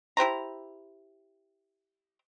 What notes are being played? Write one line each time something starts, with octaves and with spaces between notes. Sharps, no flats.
E4 G4 C5 A#5